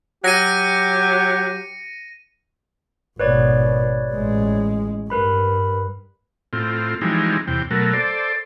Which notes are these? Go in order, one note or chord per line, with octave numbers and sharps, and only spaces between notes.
F#3 G4 A#6 C#7 D#7
G#1 B2 B4 C#5 D5
A1 G#3
G2 A#4 B4 B5
A2 C4 F4
E3 F3 G3 G#3 C4 D#4
E2 C3 G5
B2 F#3 A3 A#4
A4 C5 D5